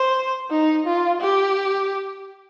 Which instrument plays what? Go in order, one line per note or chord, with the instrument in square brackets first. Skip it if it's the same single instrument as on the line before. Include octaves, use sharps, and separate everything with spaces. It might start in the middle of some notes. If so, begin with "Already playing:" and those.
Already playing: [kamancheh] C5
D#4
F4
G4